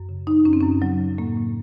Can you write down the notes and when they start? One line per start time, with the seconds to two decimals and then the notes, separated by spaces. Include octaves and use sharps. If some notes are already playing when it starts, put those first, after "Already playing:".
Already playing: F#2
0.09 C#3
0.27 C#3 D#4
0.45 F#2 C#4
0.53 C4
0.60 F#2 C#4
0.82 C#3 F#3
1.00 C#3
1.18 A2 A#3
1.38 A2